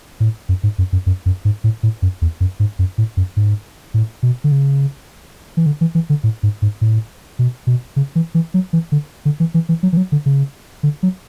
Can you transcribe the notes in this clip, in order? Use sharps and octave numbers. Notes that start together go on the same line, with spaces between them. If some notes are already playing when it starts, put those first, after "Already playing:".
A2
F#2
G#2
F#2
F#2
F#2
F#2
G#2
A2
A2
F#2
E2
F#2
G#2
F#2
A2
F#2
G#2
A2
B2
D3
C#3
E3
D3
E3
E3
D3
A2
G#2
G#2
A2
B2
B2
C#3
E3
E3
F#3
E3
D3
D3
E3
E3
E3
F#3
E3
F#3
D3
C#3
D3
F#3